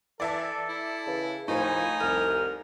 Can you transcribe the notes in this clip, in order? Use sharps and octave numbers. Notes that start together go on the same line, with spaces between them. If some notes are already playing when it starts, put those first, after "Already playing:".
E3 A4 D5 E5 A5
E4
C#3 E3
D#2 A2 F3 D#4 G#5
F1 C2 F6